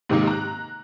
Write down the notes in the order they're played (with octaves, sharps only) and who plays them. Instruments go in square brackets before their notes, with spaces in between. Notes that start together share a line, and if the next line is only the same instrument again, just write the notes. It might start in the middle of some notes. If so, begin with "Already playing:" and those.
[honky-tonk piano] G#2 C3 D#3 G#3 A#3 D#4
A#5 F#6